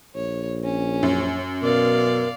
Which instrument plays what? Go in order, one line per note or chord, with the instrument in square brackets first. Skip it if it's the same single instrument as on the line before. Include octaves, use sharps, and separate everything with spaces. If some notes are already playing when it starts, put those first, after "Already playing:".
[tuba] A#1 [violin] C#5
[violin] C#4
[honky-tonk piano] F#2
[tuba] B2 [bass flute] A#4 [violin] D5 F5